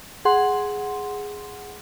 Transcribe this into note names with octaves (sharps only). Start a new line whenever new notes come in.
G#4 F#5 C6